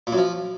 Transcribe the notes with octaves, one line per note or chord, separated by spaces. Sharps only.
A#2
F#2
F3